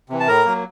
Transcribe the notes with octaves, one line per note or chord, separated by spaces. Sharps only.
C3 E3
A5
A2 A#4 A#5
F#3 A#3